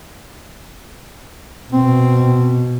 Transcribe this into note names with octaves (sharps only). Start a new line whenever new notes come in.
B2 C4